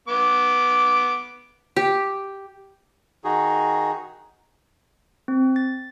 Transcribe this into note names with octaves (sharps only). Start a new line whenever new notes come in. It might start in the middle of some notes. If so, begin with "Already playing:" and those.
B3 D6
G4
D#3 D#4 F#4 G#4
C4
A6